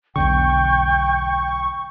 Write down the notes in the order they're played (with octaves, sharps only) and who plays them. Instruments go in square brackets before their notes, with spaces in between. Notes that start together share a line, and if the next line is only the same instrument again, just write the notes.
[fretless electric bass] B1 E2 D3 [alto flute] G5 [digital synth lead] C#6